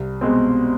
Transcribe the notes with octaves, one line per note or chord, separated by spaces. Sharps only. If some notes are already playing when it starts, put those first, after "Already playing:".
Already playing: C2
B2 G#3 C4